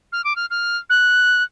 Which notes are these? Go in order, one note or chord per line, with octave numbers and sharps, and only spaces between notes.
F6
D6
F6
F6
F#6